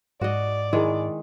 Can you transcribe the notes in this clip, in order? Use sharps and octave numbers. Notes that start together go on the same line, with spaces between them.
G#2 F#4 D5 D#5
D#3 G#3 E4 G#4